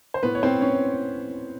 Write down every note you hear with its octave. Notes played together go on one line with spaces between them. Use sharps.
C5
A2 B3 B4
C#5
C4 C5
A2 C#4 C#5